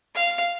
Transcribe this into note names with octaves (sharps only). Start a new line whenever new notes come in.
F5